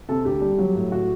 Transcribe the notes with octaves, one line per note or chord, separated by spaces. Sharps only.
C3 A4
D2 G4
G3
F#3
A2
F#4